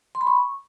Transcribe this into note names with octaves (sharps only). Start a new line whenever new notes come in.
C6
B5
C#6